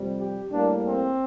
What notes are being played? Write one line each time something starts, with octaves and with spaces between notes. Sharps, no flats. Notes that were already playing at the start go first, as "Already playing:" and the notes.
Already playing: F2 C3 G3
G4
A2 G3 A#3 D4
C4